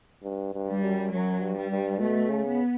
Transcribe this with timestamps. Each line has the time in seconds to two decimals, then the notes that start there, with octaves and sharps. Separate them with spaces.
0.23 G2
0.54 G2
0.68 G3
0.83 F#2
1.11 F#2 F#3
1.42 G2
1.56 G3
1.70 G2
2.00 B2 A3
2.29 C#3
2.44 B3